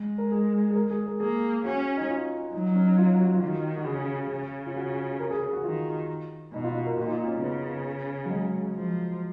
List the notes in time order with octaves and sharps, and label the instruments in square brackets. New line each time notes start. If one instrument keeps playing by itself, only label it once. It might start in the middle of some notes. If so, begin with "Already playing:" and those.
Already playing: [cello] G#3
[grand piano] A#4
G#4
G#4
A#4
G#4
A#4
[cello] A#3 [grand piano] G#4
[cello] C#4 [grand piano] F#4
[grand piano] D#4
F4
[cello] F#3 [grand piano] D#4
[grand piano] C#4
D#4
F4
F#4
F4
[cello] D#3 [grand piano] F#4
[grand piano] F#4
[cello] C#3 [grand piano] G#4
[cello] C#3
[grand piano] F4
F#4
A#4
G#4
G#4
F#4
[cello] D#3 [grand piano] F4
[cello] B2 [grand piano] D#4
[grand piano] F4
F#4
A#4
[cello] A#2 [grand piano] F#4
[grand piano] D#4
F4
C#4
[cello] C#3 [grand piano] B3
[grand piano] F#3
G#3
[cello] F3